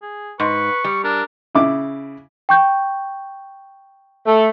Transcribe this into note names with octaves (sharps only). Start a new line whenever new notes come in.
G#4
G#2 B4 C#6
G3
D4 A#4
C#3 E4 D6
G5 C#6 G6
A3